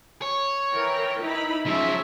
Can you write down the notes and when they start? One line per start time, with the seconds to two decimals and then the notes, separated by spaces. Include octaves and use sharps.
0.22 C#5
0.72 E3 A#4 G5
1.21 D#4 E4 B5
1.66 F3 F#3 C#4 G#4 E5